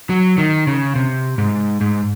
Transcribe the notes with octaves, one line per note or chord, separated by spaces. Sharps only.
F#3
D#3
C#3
C3
G#2
G#2